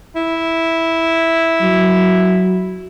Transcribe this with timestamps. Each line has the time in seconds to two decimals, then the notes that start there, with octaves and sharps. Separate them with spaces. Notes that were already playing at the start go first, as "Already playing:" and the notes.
0.16 E4
1.61 F#3